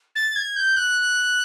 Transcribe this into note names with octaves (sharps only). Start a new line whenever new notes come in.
A6
G#6
G6
F#6